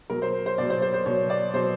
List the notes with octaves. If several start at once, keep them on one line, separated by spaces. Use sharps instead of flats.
B2 F#3 A#4
C5
C5
B2 F#3 D5
C5
C5
C5
B2 F#3 C#5
D5
B2 F#3 C5